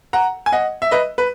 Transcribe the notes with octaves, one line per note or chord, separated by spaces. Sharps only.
F#5 A#5
G#5
D#5 F#5
E5
B4 D#5
B4